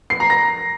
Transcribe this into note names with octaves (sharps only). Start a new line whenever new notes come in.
C7
A#5
A#6